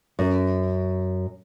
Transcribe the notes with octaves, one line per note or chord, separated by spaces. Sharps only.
F#2